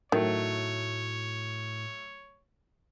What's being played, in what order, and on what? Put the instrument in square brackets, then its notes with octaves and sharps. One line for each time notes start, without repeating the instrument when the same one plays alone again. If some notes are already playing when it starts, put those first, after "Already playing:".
[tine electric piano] A2 [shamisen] D#3 [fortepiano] F#3 A3 [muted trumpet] C#5